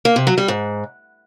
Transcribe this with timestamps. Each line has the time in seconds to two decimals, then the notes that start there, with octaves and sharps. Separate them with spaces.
0.05 A#3
0.16 C3
0.27 F#3
0.38 G3
0.48 G#2